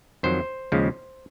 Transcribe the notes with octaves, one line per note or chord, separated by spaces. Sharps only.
F2 D#3 F#3 C5
D#2 C#3 F3 G#3